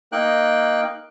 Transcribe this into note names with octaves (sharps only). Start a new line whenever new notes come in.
A#3 D#4 G5 F#6